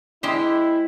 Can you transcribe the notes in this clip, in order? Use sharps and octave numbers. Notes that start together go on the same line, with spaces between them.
G#3 E4 G4 C5